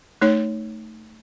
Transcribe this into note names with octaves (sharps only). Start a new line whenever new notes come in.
A3 D#4 C#5